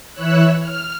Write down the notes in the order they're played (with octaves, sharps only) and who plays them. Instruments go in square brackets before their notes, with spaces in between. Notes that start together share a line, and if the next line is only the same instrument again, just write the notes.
[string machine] E3 E4 C#5 E6 F#6
F6